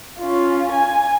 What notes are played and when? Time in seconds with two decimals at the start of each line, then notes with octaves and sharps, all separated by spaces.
0.19 C#4 F4
0.72 G#5